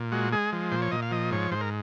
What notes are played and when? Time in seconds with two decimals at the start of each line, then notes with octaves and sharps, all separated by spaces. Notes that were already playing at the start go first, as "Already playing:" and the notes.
Already playing: A#2
0.12 G#3 F#4
0.32 G#3 G#4
0.53 F3
0.72 A#2 C5
0.82 C#5
0.92 A#2 D#5
1.02 F5
1.11 F3 D#5
1.31 G#2 C#5
1.51 G#2 C5
1.61 A#4